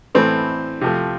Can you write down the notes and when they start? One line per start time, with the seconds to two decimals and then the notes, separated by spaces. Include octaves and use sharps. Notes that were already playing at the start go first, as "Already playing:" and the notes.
0.15 A2 E3 A3 C4
0.81 C3 F3 A3